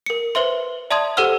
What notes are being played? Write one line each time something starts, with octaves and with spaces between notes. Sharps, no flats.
A#4 C#7
B4 C5 E5 C6
D5 E5 A5 C6 D#6 G#6
G4 A4 C5 F#5 E6 F6